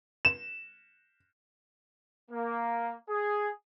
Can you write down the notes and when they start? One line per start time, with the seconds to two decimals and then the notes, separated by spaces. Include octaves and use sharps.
0.25 E7
2.30 A#3
3.09 G#4